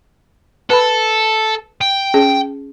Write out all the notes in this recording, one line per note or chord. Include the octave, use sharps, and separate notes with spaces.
A4 B4 B5
G5
C#4 G#4